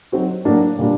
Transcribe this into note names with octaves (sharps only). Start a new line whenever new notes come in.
F#3 C4 D#4 F#4
A2 F#3 A#3 D4 F#4
A#2 G3 D4